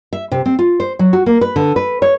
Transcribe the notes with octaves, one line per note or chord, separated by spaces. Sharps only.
E5
C3
C4
F4
C5
F#3
F#4
A#3
B4
D3
B4
C#5